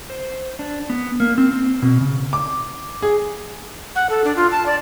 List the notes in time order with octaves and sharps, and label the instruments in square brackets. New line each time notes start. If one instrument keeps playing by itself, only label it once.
[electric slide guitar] C5
D4
B3
A#3
C4
C4
B2
C#3
[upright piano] D6
G#4
[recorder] F#5
A4
D4
F4
A5
D5